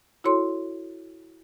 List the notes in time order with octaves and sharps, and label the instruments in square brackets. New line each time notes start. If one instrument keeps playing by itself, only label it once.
[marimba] E4 F#4 A4 C#5 C6